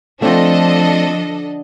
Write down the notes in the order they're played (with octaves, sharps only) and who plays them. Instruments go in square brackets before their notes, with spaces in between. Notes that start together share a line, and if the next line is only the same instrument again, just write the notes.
[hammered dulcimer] D3 [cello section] F3 [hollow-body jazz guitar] A3 C4 F4 [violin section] D4 A4 D#5